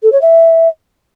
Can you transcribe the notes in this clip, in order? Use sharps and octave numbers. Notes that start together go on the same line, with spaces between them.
A4
C#5
E5